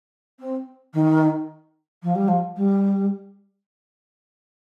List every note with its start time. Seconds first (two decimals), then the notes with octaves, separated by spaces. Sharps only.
0.39 C4
0.94 D#3
2.03 F3
2.15 G3
2.28 F3
2.56 G3